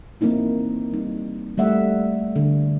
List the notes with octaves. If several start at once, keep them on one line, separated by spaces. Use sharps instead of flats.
E3 A#3 C4 D#4 E4
G3 D#4
G3 A3 E5 F#5
D3